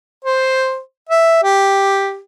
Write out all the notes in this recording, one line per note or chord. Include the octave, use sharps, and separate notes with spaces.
C5
E5
G4